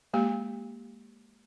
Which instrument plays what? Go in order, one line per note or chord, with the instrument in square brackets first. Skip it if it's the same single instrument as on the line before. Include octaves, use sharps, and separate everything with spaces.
[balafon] G#3 A#3 G4